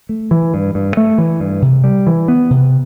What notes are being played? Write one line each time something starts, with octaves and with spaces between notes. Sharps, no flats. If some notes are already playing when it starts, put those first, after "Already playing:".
A3
E3
G2
G2
A3
E3
G2
C3
G3
E3
B3
C3